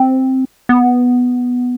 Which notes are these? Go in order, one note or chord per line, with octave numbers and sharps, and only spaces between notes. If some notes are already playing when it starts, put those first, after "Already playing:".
Already playing: C4
B3